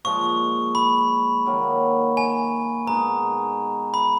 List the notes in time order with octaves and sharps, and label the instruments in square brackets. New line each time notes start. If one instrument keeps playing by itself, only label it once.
[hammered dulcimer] A#2 F3 G#3 [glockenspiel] C#6
[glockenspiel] B5
[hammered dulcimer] D#3 F#3 A#3
[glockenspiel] G#5
[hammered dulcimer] B2 G#3 D#4 [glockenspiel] A#5
[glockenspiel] B5